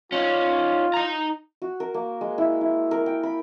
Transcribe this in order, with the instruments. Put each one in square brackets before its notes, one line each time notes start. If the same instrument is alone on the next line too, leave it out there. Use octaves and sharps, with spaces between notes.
[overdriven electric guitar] C#4 D#4 [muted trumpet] F4
[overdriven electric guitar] D#4 A#5
[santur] F#4
A#4
A#3
G#3
E4
E4
A#4
G5
B5